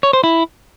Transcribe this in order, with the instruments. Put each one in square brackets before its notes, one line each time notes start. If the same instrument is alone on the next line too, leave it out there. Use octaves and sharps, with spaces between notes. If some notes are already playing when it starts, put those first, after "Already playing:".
[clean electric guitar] C#5
C5
E4